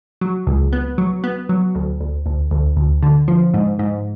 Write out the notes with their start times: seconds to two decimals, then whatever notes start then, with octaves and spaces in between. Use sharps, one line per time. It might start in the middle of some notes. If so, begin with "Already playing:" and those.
0.21 F#3
0.47 C#2
0.73 B3
0.98 F#3
1.24 B3
1.49 F#3
1.75 D2
2.01 D2
2.26 D2
2.51 D2
2.77 D2
3.03 D3
3.28 F3
3.54 G#2
3.79 G#2